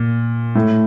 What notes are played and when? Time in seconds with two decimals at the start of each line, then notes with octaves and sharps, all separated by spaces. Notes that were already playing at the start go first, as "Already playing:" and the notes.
Already playing: A#2
0.55 A2